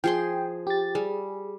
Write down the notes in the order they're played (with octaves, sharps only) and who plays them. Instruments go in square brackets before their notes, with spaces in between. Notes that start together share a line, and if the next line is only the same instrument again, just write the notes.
[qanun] F3 G#4 C6 [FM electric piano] G5
[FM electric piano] G4 A6
[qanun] G3 [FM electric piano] G#4